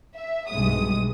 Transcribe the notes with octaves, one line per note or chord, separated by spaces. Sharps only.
E5
B1 G2 G#3 D#6